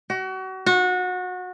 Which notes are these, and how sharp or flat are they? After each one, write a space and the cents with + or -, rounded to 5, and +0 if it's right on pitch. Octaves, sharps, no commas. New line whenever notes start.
F#4 +35
F#4 -25